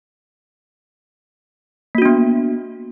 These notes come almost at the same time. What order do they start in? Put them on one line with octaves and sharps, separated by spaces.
A#3 F#4 D4 B3